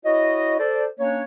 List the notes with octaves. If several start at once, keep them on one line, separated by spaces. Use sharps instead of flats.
E4 F#4 C#5 D#5
A4 C5 D5
A#3 C#4 D4 C#5